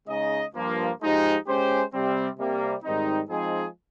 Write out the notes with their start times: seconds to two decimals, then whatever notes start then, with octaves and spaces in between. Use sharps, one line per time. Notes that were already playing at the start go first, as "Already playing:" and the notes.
0.08 C#3 G#3 D#4 G#4 D#5
0.54 G2 F3 A#3
1.00 G#2 F3 G#3 D#4 G4
1.46 G#3 C#4 G4 C5
1.92 C3 G3 C4
2.38 C3 G3 A#3
2.83 G#2 D#3 G3 C4 D#4
3.30 F3 G#3 C4 D#4 G#4